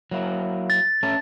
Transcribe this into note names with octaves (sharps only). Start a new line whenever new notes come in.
F#3 A#3 E4
A6
A3 C#4 A4